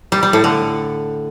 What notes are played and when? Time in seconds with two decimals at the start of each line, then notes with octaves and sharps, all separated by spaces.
0.12 G3
0.23 G3
0.33 A2
0.44 D3